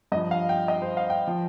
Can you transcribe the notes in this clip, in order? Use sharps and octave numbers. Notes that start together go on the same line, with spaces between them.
G2 F3 D#5
F5
G5
D#5
C5
F5
G5
F3